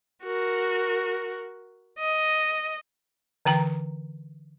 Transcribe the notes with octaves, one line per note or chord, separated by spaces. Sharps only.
F#4 A#4
D#5
D3 E3 G5 A#5